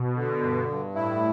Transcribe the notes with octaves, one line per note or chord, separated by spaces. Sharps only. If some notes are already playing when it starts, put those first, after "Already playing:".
Already playing: B2
D3
G2
G2
A2 E4